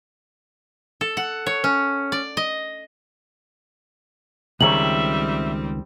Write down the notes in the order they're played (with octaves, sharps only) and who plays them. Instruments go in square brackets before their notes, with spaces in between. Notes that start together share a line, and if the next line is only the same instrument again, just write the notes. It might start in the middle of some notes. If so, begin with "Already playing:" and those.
[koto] A4
F#5
C#5
C#4
D5
D#5
[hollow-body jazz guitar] C#2 D#3 C#5 [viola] G3 C4 [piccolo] E5 [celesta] F#7